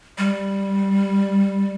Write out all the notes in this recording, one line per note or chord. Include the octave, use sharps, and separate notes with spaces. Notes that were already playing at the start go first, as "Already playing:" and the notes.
G3